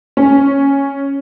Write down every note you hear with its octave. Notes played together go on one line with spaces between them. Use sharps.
C#4